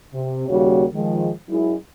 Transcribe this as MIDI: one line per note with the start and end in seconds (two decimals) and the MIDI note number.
0.14 0.48 48
0.49 0.84 39
0.49 0.84 49
0.49 0.84 55
0.49 0.84 58
0.49 0.84 66
0.49 0.84 73
0.94 1.30 51
0.94 1.30 53
0.94 1.30 56
1.49 1.76 42
1.49 1.76 56
1.49 1.76 64